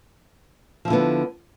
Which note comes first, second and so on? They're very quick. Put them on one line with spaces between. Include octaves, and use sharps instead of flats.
F3 E4 D3 B3